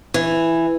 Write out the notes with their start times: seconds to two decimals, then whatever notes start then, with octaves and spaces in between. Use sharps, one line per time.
0.14 E3